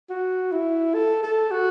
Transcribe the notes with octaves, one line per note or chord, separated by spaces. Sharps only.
F#4
E4
A4
A4
F#4